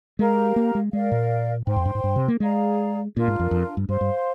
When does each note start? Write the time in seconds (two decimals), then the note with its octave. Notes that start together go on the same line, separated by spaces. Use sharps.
0.19 G#3 G4 A#4 F5 A#5
0.56 A#3
0.75 G#3
0.93 G#3 A#4 D5 F5
1.12 A#2
1.67 G#2 C5 G5 C6
1.76 F2
1.85 G2
1.95 G#2
2.04 G2
2.16 C3
2.28 A#3
2.40 G#3 G#4 D5 F5 A#5
3.15 A#2 D4 F4 A#4
3.28 G#2
3.39 F2
3.51 F2
3.77 G2
3.89 G2 C5 F5 C6
4.01 G2